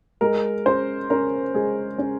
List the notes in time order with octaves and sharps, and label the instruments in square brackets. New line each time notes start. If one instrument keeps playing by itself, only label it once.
[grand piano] G#3 [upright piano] A#4
[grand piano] C#4 [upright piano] C5
[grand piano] C#4 [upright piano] A#4
[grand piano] G#3 [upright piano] G#4
[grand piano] C#4